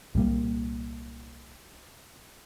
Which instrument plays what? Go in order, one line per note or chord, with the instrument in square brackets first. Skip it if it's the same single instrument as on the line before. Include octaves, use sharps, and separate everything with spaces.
[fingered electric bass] C2 A#2 G3 A#3